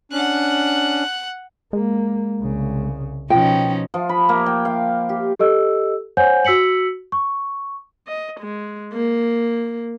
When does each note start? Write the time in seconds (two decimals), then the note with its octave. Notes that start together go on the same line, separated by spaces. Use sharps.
0.12 C#4 D4 F#5 F#6
1.73 G#3 A#3
2.40 C2 C#3
3.30 B2 F3 C#4 D#4 F4 G5
3.94 F3
4.09 B5
4.29 A#3
4.46 G5
4.65 F5
5.09 G4
5.39 G4 A4 D#5 E6
6.17 C5 C#5 F#5 G#5 G6
6.45 F#4 E6 B6 C#7 F#7
7.12 C#6
8.07 D#5
8.40 G#3
8.93 A#3